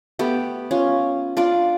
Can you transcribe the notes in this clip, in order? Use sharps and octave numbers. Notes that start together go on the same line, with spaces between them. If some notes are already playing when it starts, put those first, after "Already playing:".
A3 B3 G4
C#4 F4
D4 F4 D5